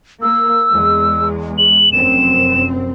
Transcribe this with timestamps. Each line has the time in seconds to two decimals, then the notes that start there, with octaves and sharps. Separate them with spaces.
0.22 A#3 E6
0.72 E2 G#3
1.58 F#7
1.92 F1 F#2 C4 E7